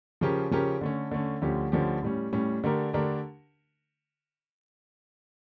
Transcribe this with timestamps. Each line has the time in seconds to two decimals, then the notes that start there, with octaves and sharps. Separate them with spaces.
0.21 C#3 F3 C#4 G4 A#4
0.51 C#3 F3 C#4 G4 A#4
0.81 D3 A3 C#4
1.11 D3 A3 C#4
1.42 D2 D3 F3 C#4 G4
1.72 D2 D3 F3 C#4 G4
2.03 A2 G3 C#4
2.32 A2 G3 C#4
2.64 D3 A3 D4 G4 A#4
2.93 D3 A3 D4 G4 A#4